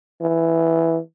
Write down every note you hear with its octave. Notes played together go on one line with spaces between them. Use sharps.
E3